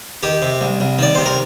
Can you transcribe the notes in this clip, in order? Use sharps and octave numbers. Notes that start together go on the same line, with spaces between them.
D#3 G4
C3
C2
C2
D#3 D5
C3 C5
A#4